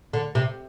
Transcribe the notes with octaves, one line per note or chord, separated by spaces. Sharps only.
D3
C3